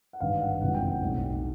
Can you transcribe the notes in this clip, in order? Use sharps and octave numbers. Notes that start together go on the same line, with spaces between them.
F#5
G#1 G2 D3 F5
F#5
F#1 F2 C3 E3 G#3 F#5
G5
F#5
B1 A2 F#3 A3